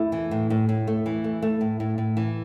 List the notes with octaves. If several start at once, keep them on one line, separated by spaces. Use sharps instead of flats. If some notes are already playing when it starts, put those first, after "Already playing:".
Already playing: A3 E4
E3
A2
A2
A2
A3
E3
A3
A3
A2
A2
A2
E3